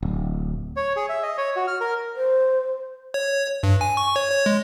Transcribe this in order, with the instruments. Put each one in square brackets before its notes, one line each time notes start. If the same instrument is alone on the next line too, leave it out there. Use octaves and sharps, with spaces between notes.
[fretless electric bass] D1
[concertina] C#5
G#4
E5
D#5
C#5
F#4
F6
A#4
[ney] C5
[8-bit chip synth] C#5
G2
G#5
C#6
C#5
C#5
G#3